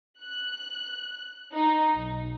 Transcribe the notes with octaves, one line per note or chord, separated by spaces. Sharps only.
F#6
D#4
B1